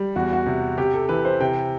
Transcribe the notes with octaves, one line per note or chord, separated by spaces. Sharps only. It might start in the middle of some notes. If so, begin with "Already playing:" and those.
Already playing: G3
E2 F#4
F#4
C3
C3 G4
A4
E3 B4
C5
C3 G5